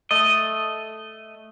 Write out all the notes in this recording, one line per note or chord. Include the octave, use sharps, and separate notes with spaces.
A3 D#5